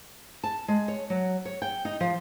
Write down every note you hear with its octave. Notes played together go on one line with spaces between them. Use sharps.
A5
G#3
C#5
F#3
C#5
G5
D#4
F3